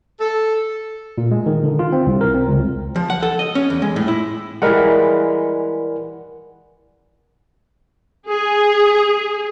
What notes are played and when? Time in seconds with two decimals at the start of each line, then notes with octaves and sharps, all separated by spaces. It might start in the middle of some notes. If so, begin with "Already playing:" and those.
0.21 A4
1.18 A#2
1.31 G#3
1.46 D#3
1.64 D3
1.79 F4
1.93 C4
2.07 C2
2.21 A#4
2.35 C4
2.48 C#2
2.96 F3
3.10 F#5
3.23 A4
3.39 D#5
3.55 C#4
3.70 E2
3.82 G#3
3.96 A2
4.08 E4
4.62 E3 G3 G#3 A#4 D5 F#5
8.27 G#4